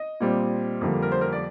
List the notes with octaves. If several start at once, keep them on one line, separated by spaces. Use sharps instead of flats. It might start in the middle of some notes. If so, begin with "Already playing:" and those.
Already playing: D#5
A#2 G3 C4
F2 D3 G3 A#3
A#4
C5
A#4
D5